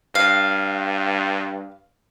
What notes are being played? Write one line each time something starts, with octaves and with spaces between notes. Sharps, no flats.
G2 F5